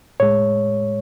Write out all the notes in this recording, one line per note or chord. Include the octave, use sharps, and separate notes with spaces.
A2 G#3 C#5